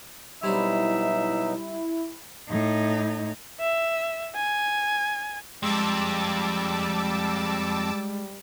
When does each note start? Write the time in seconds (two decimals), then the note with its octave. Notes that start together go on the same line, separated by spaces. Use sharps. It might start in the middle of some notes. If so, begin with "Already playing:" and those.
0.43 B2 F#3 G3 C4 D#4 E4 D5 E5
2.50 A2 D#4
3.60 E5
4.36 G#5
5.63 F2 G3 G#3 A5 D6 E6